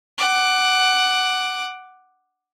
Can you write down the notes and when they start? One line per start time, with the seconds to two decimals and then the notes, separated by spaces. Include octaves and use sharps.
0.18 F#5 D6